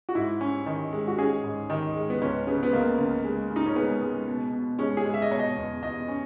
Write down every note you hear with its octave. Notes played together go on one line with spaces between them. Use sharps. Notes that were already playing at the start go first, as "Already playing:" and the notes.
F#4
G#2 E4
C#4
D#3
G#3
F#4
C#4 G#4
G#2
D#3
G#3
B3
C#2 C#4
C#3 B3
B3
C#2 A#3
C#2
G#3
C#3
D#4
C#4
G#3 B3
G#3
B2
B2
G#3 C#4
G#4
G#3
E5
D#5
B2 C#5
D#5
E2
E2 D#5
C#4